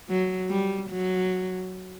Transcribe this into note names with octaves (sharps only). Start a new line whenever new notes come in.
F#3
G3
F#3